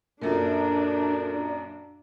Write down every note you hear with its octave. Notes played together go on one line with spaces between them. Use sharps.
F#2 A#2 D4 F4 A4 A#4